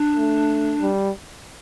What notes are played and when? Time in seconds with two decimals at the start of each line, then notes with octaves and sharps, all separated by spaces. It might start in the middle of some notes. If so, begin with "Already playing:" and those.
Already playing: D4
0.16 A3
0.81 G3